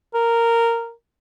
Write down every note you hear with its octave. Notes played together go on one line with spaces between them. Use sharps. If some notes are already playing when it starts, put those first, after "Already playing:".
A#4